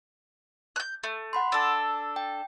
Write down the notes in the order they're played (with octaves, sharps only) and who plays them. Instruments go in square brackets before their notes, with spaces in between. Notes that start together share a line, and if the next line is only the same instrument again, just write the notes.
[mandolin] F#6 G6
A3
[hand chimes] F#5 B5 C6
[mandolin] D4 A4 [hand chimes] E6
[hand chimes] G5